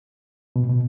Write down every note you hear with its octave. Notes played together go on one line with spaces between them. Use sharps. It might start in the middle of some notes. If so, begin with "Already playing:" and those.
B2
A2
B2